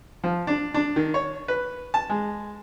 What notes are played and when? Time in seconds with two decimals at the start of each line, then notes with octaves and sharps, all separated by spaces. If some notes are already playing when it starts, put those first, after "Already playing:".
0.24 F3
0.47 D4
0.74 D4
0.96 D#3
1.14 C#5
1.48 B4
1.94 A5
2.10 G#3